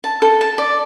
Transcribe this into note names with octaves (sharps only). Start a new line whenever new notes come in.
A5
A4
A5
D5